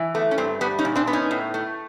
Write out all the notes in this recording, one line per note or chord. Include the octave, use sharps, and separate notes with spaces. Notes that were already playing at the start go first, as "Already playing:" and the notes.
Already playing: E3
A3 B3
C#4
G2 C4
G3 B3
C#4 D#4
A#2
C4 D4
B3
C#4 D#4
A2
A3